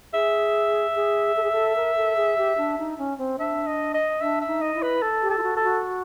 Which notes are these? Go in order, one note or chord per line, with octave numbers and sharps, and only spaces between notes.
G#4 E5
G#4
A4
G#4
A4
A#4
A4
G#4
G4
D4
D#4
C#4
C4
D4 E5
D#5
D#5
D4 E5
E5
D#4
D#5
E4
B4
A4
G4
A4
F4
F#4
A4
F#4